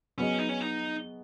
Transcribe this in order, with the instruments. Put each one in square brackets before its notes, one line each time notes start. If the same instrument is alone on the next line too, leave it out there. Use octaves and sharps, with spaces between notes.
[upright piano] F#3 B3 G#4 D#5 [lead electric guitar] C#4
[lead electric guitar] D#4
C#4
D#4